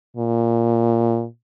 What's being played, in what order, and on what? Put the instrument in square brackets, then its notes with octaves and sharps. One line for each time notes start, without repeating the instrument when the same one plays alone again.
[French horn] A#2